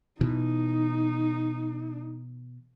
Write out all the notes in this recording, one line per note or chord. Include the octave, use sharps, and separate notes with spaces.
B2 E3 D#4